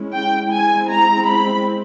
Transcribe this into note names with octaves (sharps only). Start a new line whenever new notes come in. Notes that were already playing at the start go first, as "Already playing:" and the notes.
Already playing: G#3 C#4 E4
G5
G#3 C4 E4 G#5
A#5
B5